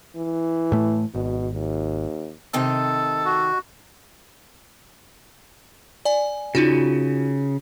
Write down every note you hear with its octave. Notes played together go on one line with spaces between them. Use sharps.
E3
A2 A3
G#1 B2
D#2
C3 D#3 A4 D#5
F#4
D5 G#5
C#3 D#4 F4 F#4